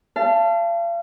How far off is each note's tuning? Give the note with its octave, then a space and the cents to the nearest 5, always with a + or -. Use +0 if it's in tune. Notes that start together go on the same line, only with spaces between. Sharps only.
F5 -40 A5 +0